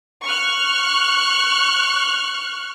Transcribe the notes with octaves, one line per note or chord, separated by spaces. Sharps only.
C#6 F6 F#6